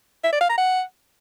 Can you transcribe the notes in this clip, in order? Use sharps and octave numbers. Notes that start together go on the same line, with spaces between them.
E5
D5
F5
A#5
F#5